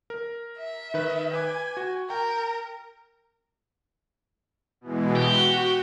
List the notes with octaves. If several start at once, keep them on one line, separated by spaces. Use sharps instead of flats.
A#4
E5
D#3 B4
B4 G#5 D6
F#4
A#4 G5
B2 E3 G#3
F#4 G4